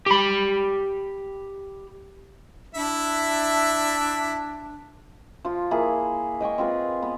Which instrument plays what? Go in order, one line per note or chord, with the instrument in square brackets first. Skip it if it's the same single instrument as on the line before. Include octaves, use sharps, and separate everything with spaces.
[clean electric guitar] G4 B5
[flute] D4 [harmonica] E4 E5
[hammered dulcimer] F3 F4
A#3 E4 G#4
D#5 G5 G#5 C#6
C4 F4 G#4 B4
B3